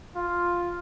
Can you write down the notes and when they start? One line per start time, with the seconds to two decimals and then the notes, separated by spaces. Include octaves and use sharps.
0.17 F4